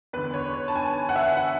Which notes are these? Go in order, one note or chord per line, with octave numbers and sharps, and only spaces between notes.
E2 D3 B4
C#5
C#5
A5
G#5
F#5
E5
F#5